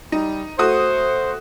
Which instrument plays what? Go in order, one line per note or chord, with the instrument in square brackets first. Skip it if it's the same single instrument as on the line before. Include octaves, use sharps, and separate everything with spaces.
[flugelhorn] G3 [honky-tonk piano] D#4
[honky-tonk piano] A3 F#4 D#6 [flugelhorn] C5